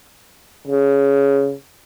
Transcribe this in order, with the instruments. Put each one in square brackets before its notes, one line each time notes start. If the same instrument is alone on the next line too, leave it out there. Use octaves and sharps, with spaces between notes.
[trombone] C#3